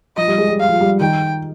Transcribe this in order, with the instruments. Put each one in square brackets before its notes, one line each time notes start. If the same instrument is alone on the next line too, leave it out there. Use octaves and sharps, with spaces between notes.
[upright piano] F3 [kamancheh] D#5
[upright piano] G3
G#3
G3
[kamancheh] F5
[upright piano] F3
G3
[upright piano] D#3 [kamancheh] G5